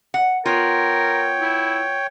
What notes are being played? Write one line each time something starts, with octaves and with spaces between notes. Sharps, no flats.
F#5
B3 F4 A#4 C#5 G5
E4